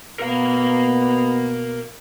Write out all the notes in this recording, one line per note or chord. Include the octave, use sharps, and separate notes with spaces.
B2 B3 A#4 F5